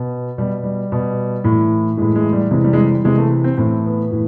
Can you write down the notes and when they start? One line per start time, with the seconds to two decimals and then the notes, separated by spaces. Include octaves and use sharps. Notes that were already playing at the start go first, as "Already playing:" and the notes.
Already playing: B2
0.38 B2 G3
0.63 G3
0.92 B2
1.44 A2 E3
1.97 A2 E3 G#3
2.15 G#3
2.33 G3
2.51 C3 E3 G#3
2.64 G3
2.73 G#3
2.78 G3
2.90 G3
3.04 C3 E3 G#3
3.17 A3
3.44 C4
3.57 A2 E3 C4
3.85 B3
4.11 A2 E3